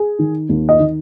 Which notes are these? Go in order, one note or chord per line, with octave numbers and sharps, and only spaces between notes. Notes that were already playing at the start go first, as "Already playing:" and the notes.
Already playing: G#4
D#3
D#2
D#5
D#3